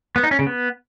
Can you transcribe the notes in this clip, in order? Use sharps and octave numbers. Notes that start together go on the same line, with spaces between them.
B3
D#4
C#4
C#3
B3